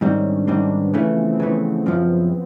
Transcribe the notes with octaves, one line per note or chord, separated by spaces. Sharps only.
G#2 D#3 G3 C4 C#4
D4
G#2 D#3 G3 C4
B3
C#3 E3 F3 A3
C4
B3
C#3 E3 A3
F#2 C#3 F3